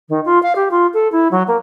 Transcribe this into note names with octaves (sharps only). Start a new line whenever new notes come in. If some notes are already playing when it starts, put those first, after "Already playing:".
D#3
F4
F5
G4
F4
A4
E4
F#3
A#3